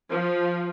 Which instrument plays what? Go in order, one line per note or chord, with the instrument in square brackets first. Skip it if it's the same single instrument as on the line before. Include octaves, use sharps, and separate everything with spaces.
[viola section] F3